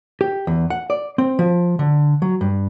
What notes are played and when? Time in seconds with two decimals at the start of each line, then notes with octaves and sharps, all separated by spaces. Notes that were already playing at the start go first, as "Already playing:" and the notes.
0.21 G4
0.47 E2
0.70 F#5
0.90 D5
1.18 C4
1.39 F3
1.79 D3
2.22 F#3
2.41 G2